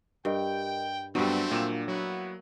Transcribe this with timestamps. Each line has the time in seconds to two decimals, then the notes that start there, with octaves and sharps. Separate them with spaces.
0.25 G2 G4 A#4 D#5 G5
1.15 G2 F#3 G3 A3 B3 C4 D4
1.51 A#2 A#3 E7
1.88 F#3 B3 E4 F#4